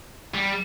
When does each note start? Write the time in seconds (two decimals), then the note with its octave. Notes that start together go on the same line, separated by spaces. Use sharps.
0.34 G3